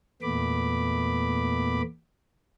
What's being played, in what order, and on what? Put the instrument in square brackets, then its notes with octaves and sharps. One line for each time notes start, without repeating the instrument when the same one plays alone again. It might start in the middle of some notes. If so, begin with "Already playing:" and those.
[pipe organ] E2 A#2 A3 B3 B5 D6